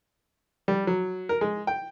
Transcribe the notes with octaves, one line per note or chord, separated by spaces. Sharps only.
G3
F#3
A#4
G#3
G5